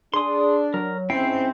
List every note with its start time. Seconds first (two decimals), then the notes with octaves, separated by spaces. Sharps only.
0.14 D4 G#4 C6 D#6
0.74 F#3 A#4
1.10 G#2 C4 C#4 E4 G5 C7